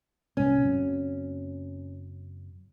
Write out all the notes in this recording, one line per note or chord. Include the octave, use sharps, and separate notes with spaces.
C2 A#2 C#4
F#1 F#3 C4